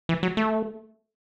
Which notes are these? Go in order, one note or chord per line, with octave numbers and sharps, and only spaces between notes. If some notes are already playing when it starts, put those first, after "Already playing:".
E3
F#3
A3